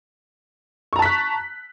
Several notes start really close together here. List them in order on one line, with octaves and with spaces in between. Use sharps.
C#6 A#5 A5 B6 F#6